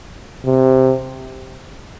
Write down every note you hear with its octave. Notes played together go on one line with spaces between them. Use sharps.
C3